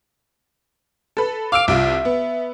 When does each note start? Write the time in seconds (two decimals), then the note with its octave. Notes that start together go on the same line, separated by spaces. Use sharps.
1.17 A4 B4
1.52 F5 D6 E6 D7
1.68 C2 F4 E5
2.05 B3